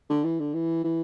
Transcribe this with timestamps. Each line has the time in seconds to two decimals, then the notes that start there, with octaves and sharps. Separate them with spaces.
0.10 D3
0.24 E3
0.40 D3
0.54 E3
0.84 E3